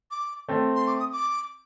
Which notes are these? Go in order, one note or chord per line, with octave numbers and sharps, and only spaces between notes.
D6
A3 C4
C6
D6
D#6
D6